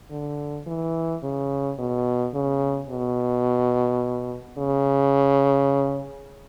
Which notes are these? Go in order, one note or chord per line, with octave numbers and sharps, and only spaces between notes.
D3
E3
C#3
B2
C#3
B2
C#3